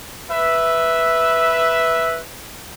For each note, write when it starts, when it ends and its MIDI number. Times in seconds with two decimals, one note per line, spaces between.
0.31 2.20 71
0.31 2.20 76